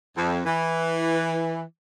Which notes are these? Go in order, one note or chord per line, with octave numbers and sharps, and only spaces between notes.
F2
E3